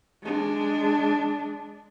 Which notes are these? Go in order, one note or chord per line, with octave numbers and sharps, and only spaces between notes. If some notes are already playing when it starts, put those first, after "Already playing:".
G#3 D4